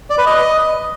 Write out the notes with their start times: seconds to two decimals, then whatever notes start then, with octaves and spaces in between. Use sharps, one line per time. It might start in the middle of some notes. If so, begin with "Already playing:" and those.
0.10 D5
0.18 B4
0.26 D#5